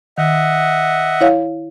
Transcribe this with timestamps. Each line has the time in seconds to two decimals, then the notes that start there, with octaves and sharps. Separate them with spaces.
0.18 D#3 D#5 E5 F#5
1.21 E4 C#5 F5